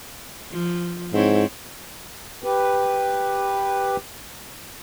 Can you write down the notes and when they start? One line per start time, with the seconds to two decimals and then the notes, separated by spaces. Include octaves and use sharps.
0.52 F3
1.13 G#2 C4 E4 C#5
2.44 G4 B4